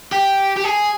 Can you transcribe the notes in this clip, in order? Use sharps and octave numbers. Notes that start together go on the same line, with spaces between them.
G4
G4
G#4